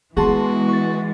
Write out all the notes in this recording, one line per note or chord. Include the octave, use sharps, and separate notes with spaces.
E3 G#3 B3 F#4 G#4 A5 C6
C#6 A6